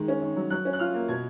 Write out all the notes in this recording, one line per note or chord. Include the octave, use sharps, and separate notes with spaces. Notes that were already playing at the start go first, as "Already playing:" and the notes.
Already playing: D#3 G#3
C#4
D#3
F#3
F#3 F#6
C#4
F#6
F4 F6
A#3
B2 G#6